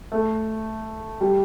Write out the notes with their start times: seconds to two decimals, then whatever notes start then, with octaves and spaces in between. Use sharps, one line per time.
0.12 A3
1.21 G3